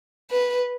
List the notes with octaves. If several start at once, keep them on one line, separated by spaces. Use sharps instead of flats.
B4